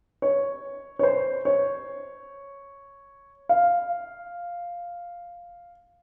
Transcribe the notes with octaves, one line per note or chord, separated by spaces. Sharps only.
C#5
C#5
C5
C#5
F5